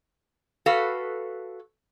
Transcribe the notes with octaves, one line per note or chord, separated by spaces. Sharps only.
F#4 A4 B4 F5